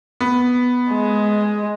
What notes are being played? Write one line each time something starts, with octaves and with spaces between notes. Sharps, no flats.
B3
G#3